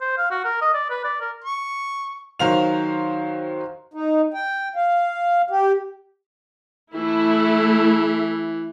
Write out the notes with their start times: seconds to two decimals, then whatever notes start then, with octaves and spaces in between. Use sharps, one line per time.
0.01 C5
0.18 F5
0.31 F#4
0.45 A#4
0.62 D#5
0.74 D5
0.90 B4
1.04 D5
1.21 A#4
1.44 C#6
2.39 D#3 F#3 C5 F5 F7
3.94 D#4
4.34 G5
4.76 F5
5.51 G4
6.94 E3 A3 E4